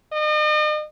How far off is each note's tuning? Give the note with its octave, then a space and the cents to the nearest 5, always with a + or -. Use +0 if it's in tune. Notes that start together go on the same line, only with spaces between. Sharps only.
D#5 -40